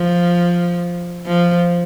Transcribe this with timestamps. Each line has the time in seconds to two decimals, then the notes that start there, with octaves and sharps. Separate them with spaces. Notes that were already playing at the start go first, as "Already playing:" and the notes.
Already playing: F3
1.26 F3